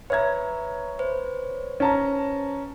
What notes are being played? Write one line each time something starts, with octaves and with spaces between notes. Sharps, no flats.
B4 C#5 E5 A#5 G#6
B4 C5
C#4 A5 A#5